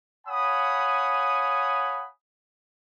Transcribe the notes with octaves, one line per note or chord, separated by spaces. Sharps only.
C#5 F5 F#5 G#5 B5 D#6